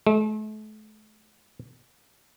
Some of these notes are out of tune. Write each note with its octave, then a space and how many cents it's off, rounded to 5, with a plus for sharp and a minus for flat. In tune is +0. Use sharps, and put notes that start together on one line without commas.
A3 -40